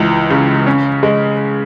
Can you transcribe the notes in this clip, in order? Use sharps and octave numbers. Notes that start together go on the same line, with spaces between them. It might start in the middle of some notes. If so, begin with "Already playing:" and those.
Already playing: C#2 E3
C#3
C#4
G#3